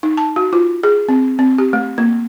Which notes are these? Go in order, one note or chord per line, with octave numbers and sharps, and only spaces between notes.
D#4
A5
F#4
F4
G#4
C4
C4
G4
A3
A#3